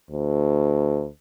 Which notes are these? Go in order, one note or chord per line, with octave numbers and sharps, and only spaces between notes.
D2